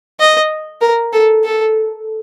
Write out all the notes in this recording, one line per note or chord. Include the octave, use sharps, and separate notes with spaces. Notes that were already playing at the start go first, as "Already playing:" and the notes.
D#5
A#4
A4
A4